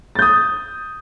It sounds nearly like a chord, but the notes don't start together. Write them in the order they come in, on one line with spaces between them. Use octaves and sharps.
A6 G6 D#6